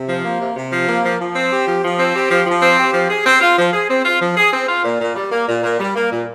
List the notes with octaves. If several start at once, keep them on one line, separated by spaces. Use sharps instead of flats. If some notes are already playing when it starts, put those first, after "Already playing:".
Already playing: C3
F3
A#3
C3
C3
F3
A#3
F3
F3
C4
G4
F3
F3
C4
G4
F3
F3
C4
G4
F3
G#4
C4
F4
F3
G#4
C4
F4
F3
G#4
C4
F4
A#2
A#2
G3
A#3
A#2
A#2
G3
A#3
A#2